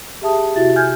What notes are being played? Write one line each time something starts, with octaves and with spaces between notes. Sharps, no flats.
G4 G#4 E5 A5 D#6
C3 E4 F#4 E5 A6
G#5 F6 G6 G#6